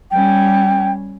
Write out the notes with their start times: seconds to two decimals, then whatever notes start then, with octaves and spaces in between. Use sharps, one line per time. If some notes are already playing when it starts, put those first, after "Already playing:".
0.11 G3 C#4 G5